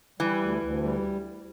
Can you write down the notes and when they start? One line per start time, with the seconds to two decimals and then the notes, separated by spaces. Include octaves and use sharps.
0.20 E3 G3
0.41 D2
0.62 D2
0.83 G3